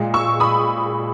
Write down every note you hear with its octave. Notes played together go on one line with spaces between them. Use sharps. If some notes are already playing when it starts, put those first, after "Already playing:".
Already playing: A#2 G#3
C#6 E6
B5 D#6